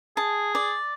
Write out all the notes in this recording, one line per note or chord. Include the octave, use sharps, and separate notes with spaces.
G#4 A5
D5